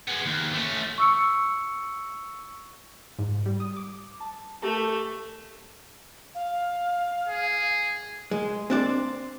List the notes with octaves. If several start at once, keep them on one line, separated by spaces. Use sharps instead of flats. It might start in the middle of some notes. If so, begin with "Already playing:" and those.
G#3 B3
D#2
A3 C#4
C#6 E6 C#7
G#2
G3
D#6
D6
A5
A3 G4 A#4 A5
F5
G#4
G#3
C4 D4 D5